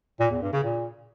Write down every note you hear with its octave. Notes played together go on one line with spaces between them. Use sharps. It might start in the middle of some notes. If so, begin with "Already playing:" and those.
A#2
E2
G2
C#3
A#2